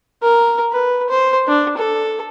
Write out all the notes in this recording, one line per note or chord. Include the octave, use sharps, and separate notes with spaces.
A#4
B4
C5
D4
A4